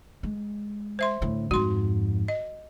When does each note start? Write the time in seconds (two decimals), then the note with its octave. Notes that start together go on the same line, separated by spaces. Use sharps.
0.23 G#3
0.99 C5 E5 C6
1.22 D2 A2
1.51 F2 G#2 F#4 C6
2.28 D#5